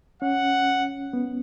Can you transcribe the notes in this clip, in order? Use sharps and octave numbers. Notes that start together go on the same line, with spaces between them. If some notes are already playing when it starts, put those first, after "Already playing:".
C#4 F#5
B3